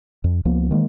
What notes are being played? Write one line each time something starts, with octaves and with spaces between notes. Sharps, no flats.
F2
C#2 F3 A#3 B3
D#3 E3 G#3 A#3